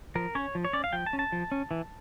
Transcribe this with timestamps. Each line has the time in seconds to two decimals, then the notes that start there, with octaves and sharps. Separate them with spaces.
0.15 F3 A#4
0.35 C#4 C#5
0.55 F3
0.65 C#5
0.73 C#4 D5
0.84 F5
0.93 F3 G5
1.06 A5
1.13 C#4
1.19 A5
1.32 F3
1.52 C#4
1.71 E3